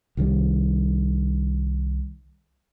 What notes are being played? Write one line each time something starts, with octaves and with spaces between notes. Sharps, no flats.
C2 D#3 F#3 G3